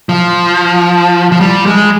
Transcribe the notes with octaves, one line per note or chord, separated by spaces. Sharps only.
F3
F3
G3
G#3